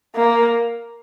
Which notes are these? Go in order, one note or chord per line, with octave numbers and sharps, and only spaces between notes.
A#3